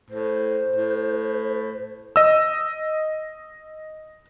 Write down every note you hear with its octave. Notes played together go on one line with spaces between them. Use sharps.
A2 C5
A2
D#5 E6